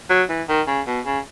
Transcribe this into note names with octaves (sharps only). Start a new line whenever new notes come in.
F#3
E3
D#3
C#3
B2
C#3